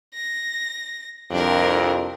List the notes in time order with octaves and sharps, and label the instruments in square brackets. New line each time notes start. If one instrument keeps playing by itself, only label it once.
[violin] A#6
[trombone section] C2 F2 [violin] D4 A#4